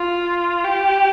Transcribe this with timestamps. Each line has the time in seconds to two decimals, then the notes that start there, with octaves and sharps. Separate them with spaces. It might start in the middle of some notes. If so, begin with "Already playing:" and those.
Already playing: F4
0.64 G4